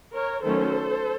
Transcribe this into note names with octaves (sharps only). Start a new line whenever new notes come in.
A#4 C#5
D#3 F#3 A3 C#4 A4 C5